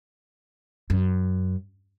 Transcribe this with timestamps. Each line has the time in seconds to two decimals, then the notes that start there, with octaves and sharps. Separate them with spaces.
0.90 F#2